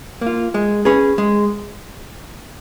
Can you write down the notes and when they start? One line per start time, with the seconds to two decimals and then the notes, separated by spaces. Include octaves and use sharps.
0.21 A#3 F4
0.54 G#3
0.85 C#4 G#4 B4
1.18 G#3